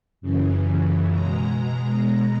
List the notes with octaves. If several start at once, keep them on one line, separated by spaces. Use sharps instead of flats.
F#2 C#3 E3
B2 G#3 A#5